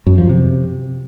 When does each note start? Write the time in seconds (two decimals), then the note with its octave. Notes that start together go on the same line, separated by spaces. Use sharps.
0.06 F#2
0.18 F3
0.29 C3